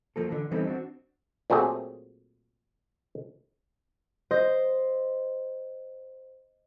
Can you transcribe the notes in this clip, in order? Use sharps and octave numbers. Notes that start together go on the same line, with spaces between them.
F3 A#3 A4
D3 E3
E3 G3 B3 C4 D#4 A4
C4 D4 F#4
A#2 F#3 A3 C4 G#4
C5 D#5